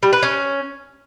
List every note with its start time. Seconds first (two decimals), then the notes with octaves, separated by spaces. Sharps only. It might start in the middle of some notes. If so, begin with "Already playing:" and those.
0.03 G3
0.13 B4
0.23 C#4